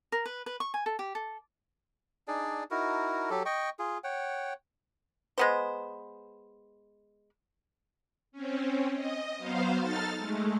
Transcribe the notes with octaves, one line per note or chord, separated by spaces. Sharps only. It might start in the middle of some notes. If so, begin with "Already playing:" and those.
A#4
B4
B4
C#6
G#5
A4
G4
A4
D4 D#4 G#4 D5
D#4 E4 F#4 A#4
F#3 G4 A4
D#5 G5 C#6
F4 G#4
C#5 F#5 G5
G#3 B3 C5
C4 C#4
D#5
F#3 B3 C5 F5
D#4 A4 F6 A6
G#3 A3